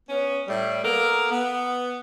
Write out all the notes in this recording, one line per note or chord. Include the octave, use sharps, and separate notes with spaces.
B3 C#4
A2 G3
A#3 B3 A4 A#4
B3